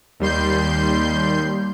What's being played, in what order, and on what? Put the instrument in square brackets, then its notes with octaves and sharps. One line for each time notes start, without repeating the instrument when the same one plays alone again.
[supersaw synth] D#2 G3 C6 G6